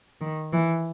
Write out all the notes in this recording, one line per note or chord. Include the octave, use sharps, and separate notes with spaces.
D#3
E3